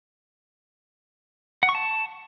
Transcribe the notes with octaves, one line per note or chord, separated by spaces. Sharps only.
F#5
C#6
A5